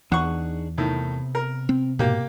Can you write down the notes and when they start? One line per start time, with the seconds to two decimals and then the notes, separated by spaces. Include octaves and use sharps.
0.12 E2 D4 D#4 G#4 F#5 C#6
0.78 A2 C3 D#3 B3
1.35 A#4
1.69 C4
1.99 G#2 B2 A#3 G4